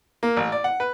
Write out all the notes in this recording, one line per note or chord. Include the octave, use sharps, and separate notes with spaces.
A#3
A1
D5
F#5
B4